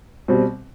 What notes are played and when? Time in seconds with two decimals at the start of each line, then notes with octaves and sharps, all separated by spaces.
0.28 B2 G3 C4